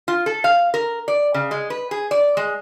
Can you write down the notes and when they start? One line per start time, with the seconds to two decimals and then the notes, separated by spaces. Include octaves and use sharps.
0.08 F4
0.26 A4
0.44 F5
0.74 A#4
1.08 D5
1.34 C#3
1.51 G#3
1.70 B4
1.91 G#4
2.11 D5
2.37 G#3